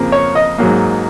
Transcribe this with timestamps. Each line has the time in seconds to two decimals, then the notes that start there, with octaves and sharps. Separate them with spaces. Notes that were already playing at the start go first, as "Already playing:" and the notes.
Already playing: F2 C#3 F3 A#3
0.12 C#5
0.35 D#5
0.58 G#2 F#3 A#3